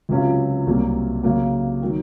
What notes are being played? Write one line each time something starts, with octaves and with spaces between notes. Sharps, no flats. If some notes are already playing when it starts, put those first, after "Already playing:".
C#2 C3 F#3 C#4 F4
C2 C3 F#3 A#3
C#3 F#3 A#3
D#3 F#3